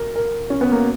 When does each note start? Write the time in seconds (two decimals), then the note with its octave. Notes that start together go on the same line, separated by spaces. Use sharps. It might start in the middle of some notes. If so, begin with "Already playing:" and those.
Already playing: A#4
0.16 A#4
0.50 C#4
0.61 B3
0.72 A#3